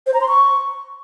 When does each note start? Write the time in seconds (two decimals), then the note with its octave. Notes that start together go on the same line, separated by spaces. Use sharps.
0.07 C5
0.14 A#5
0.21 C6
0.28 C#6